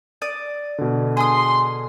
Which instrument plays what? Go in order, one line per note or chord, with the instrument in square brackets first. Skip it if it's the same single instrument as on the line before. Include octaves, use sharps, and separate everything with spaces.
[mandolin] D5 D6 D#6
[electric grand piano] B2 D3
[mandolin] G#4 D#6 [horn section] C6